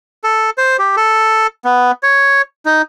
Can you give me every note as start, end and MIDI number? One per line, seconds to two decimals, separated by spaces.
0.24 0.50 69
0.58 0.77 72
0.79 0.96 67
0.97 1.47 69
1.65 1.92 59
2.03 2.42 73
2.66 2.82 63